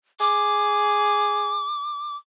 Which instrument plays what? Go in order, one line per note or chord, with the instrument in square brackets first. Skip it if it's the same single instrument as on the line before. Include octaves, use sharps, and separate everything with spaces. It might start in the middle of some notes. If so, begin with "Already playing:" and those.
[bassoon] G#4 [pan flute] D6